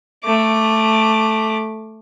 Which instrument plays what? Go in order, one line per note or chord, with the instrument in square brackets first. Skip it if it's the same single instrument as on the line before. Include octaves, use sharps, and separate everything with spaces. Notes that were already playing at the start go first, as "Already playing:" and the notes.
[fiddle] A3 D6